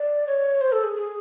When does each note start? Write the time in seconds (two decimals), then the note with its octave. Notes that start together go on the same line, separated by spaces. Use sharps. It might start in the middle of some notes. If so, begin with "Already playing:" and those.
Already playing: D5
0.27 C#5
0.61 C5
0.72 A4
0.84 G#4
0.96 G#4